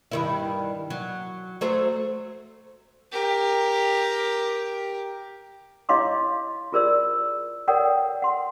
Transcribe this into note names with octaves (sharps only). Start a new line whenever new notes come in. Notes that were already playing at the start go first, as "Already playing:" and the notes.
G2 D#3 E4
F#3
F#3 A3 C5
G4 A#4
E4 C#5 D#5 F5 C6 D6
F4 G#4 A#4 C5 D5 E6
A4 A#4 C#5 D5 F#5 G5
F#5 C6